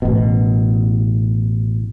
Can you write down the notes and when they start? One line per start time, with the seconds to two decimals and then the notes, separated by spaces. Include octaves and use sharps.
0.02 A1 B2